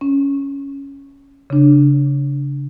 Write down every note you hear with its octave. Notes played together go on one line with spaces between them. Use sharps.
C#4
C#3 D4